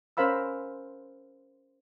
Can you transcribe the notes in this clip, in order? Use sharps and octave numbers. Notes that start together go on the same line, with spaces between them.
C#4 A#4 C5 F5 B5 E6